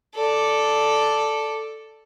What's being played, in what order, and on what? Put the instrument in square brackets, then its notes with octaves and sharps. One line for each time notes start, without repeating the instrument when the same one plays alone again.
[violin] A4 D5